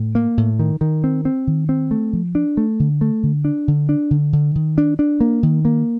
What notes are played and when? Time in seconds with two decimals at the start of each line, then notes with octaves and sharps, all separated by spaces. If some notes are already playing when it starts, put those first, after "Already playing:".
Already playing: A2
0.15 A#3
0.37 A2
0.59 D#3
0.81 D#3
1.04 C4
1.25 C4
1.47 D#3
1.69 C4
1.91 A3
2.13 F3
2.35 D4
2.57 A3
2.80 D3
3.01 A3
3.23 D3
3.45 D4
3.68 D3
3.89 D4
4.11 D3
4.33 D3
4.55 D#3
4.78 D4
4.99 D4
5.20 A#3
5.43 D#3
5.65 A#3